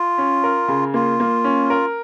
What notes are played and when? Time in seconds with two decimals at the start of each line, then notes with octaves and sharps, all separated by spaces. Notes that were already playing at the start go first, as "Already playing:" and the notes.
Already playing: F4
0.18 C#4
0.44 A#4
0.68 C#3
0.94 A#3 F4
1.20 A#3
1.44 C#4
1.70 A#4